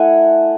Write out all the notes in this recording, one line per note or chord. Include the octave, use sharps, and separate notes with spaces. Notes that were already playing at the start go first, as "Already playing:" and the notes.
Already playing: A3 E4 F#5 G#5